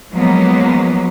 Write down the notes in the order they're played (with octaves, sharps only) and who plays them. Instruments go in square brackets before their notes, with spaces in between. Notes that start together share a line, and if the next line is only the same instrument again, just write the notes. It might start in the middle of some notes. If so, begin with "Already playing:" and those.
[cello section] F3 F#3 G#3 A#3 B3 C#4